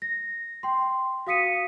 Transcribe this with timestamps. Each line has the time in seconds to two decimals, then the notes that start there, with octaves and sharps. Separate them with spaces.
0.02 A#6
0.63 G5 C6
1.27 F#4 F5 D#6 B6 C#7 D#7